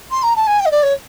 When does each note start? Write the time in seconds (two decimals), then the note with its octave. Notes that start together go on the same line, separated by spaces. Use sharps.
0.11 C6
0.23 A#5
0.36 A5
0.47 G#5
0.60 G5
0.66 D#5
0.71 D5
0.83 C#5